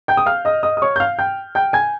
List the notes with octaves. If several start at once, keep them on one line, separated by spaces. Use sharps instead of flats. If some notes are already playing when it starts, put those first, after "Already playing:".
G5 G6
D#6
F5 F6
D#5 D#6
D#5 D#6
D#6
C#5 C#6
G6
F5 F6
G5 G6
G5 G6
G#5 G#6